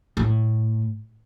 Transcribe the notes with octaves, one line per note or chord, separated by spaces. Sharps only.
A2